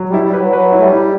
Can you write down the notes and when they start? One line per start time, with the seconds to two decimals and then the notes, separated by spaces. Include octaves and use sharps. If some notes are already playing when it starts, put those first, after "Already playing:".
Already playing: F#3
0.09 G3 E4
0.24 G3
0.33 B4
0.38 F#3
0.53 F#3 B4
0.72 E4
0.79 A3
0.82 G3
0.92 E4